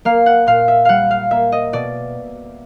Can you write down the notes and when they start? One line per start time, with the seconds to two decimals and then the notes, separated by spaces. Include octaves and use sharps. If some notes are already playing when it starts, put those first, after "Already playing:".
0.05 A#3 F5
0.26 F#5
0.47 A#2 F5
0.68 E5
0.85 G3 F5 F#5
1.11 F5
1.31 A#3 E5
1.52 D#5
1.73 B2 D5